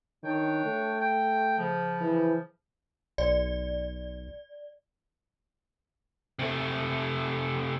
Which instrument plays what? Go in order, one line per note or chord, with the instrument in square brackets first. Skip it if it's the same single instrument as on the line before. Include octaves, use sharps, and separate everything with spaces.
[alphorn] D#3 [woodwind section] D4 C#5 G5
[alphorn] A3
[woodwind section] G5
C#3 F3
[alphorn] E3
[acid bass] B1 [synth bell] D5
[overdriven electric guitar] C3 A3